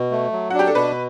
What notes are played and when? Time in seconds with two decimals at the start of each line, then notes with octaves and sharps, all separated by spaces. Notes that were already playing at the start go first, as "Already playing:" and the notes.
Already playing: B2
0.11 A3
0.32 F#3
0.50 F#4
0.54 D4
0.59 G4
0.67 A4
0.75 B2 B4